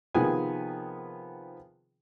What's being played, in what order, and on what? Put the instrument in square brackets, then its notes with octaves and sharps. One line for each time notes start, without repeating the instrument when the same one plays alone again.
[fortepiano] C3 D#3 F3 B3 G#4 G#5